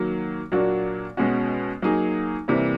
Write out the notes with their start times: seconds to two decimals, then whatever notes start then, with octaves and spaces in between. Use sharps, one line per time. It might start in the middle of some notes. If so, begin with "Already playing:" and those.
Already playing: D#3 F#3 A#3
0.52 A#2 F#3 A#3 D4 F#4
1.17 B2 G#3 C#4 F#4
1.82 F#3 A#3 D#4 G#4
2.48 C3 E3 G3 A#3